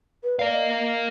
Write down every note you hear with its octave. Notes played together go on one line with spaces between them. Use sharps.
B4
A#4 D5 F5
D#5